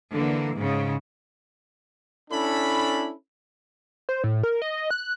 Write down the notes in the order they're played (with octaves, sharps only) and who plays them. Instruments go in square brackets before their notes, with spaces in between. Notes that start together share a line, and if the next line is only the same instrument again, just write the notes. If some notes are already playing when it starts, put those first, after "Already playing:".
[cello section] D3 E3 A#3
G#2 C#3
[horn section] C#4 D4 E4 A4 B5
[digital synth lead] C5
A2
A#4
D#5
F#6